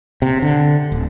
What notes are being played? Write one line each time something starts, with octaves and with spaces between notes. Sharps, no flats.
C3
D3
D1